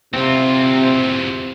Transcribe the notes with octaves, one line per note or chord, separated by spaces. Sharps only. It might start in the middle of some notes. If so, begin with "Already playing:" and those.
E2 C3 C4 F4